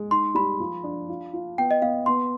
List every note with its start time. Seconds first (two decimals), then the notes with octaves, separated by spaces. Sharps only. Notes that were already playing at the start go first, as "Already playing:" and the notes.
Already playing: G#3
0.11 D#4 C6
0.35 G3 B5
0.60 F3
0.84 D4
1.09 F4
1.33 F4
1.58 B3 G5
1.71 D#5
1.82 B3 F5
2.06 B3 C6